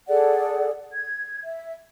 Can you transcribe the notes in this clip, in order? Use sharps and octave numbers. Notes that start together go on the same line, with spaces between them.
G#4 A4 D5 F#5
G#6
E5